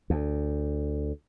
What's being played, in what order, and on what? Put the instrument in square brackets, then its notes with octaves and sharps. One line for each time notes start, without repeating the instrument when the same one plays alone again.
[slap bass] D2